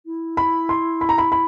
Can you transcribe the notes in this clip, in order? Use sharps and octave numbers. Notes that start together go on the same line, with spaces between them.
E4
B5
C6
B5
A#5
B5
B5